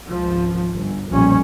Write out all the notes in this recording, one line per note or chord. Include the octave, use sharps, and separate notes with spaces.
G#1 C#2 F3
G1
B1 F2 A#2 F3 G3 C#4